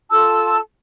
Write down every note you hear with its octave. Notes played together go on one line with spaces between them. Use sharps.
F4 A4 A5 E6